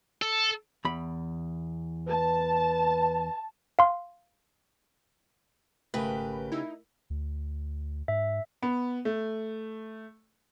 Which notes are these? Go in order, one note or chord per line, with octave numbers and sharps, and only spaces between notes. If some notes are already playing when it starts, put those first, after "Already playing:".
A4
E2 B5
B4 A5
F5 C6
G#1 C#3 A3 G4 A#4 B4
D#4 E4
D2
G#2 E5
B3
A3